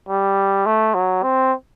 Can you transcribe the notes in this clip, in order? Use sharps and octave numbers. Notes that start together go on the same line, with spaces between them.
G3
A3
F#3
C4